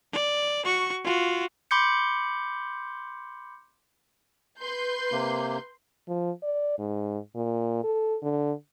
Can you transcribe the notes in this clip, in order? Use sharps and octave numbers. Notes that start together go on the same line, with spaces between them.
D5
F#4 C#6
F4 F#4
B5 C6 D6 G6 C#7
B4 C6 G6
C3 A#3
F3
D5
G#2
A#2
A4
D3